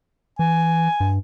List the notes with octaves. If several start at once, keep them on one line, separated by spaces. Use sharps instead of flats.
E3 G#5
G2